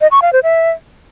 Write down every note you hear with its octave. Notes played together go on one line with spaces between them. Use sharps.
D#5
C#6
F5
C5
E5